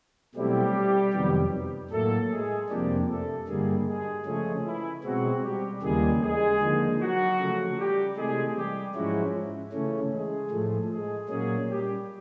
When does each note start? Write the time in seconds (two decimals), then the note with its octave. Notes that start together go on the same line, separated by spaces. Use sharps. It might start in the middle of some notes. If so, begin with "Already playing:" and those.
0.35 B2 F#3 G3 A3 C4 E4 G4
1.13 F2 C3 D#3 F#3 B3
1.91 A2 F#3 A3 A#3 A4
2.30 G#3 G#4
2.70 F2 C3 F3 G3 A#3 D4 G4
3.09 A3 A4
3.47 G2 D3 G3 G#3 A#3 G#4
3.86 G#3 G#4
4.26 C#3 F3 G#3 A3 C#4 G#4
4.65 E3 E4
5.04 B2 F#3 G#3 C4 F#4
5.42 G3 G4
5.82 D#2 C#3 E3 G3 G#3 A#3 G#4
6.21 G#3 G#4
6.60 D3 F3 A#3 D#4
6.99 F#3 F#4
7.39 C#3 F3 A3
7.77 G3 G4
8.16 C3 E3 G#3 A3 G#4
8.55 G3 G4
8.95 G#2 F3 F#3 G#3 C#4 E4 F#4
9.73 C#3 E3 A3 C#4
10.12 G#3 G#4
10.51 A2 F3 A3
10.90 G#3 G#4
11.29 A#2 F#3 G#3 A#3 C#4 G#4
11.68 G3 G4